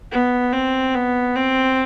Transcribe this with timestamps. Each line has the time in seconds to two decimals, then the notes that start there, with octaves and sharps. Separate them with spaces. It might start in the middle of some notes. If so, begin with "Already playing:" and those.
0.12 B3
0.52 C4
0.94 B3
1.35 C4